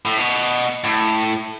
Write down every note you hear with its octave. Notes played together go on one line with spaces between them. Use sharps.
A2
B2
A2